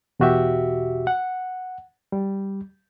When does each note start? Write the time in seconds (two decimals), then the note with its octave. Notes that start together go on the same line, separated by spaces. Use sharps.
0.20 E2 B2 F#4 G4 E5
1.07 F#5
2.12 G3